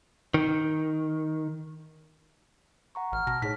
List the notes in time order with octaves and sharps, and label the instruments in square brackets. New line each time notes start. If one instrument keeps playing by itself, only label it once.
[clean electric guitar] D#3
[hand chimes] F#5 A#5 C#6
[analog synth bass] A1 [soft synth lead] F6
[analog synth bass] B2 [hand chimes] A5 A#6
[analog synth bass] A2 [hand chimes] D#4 G#4 C#5 [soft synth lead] B6